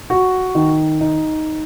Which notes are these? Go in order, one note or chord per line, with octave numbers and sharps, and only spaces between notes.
F#4
D#3
D#4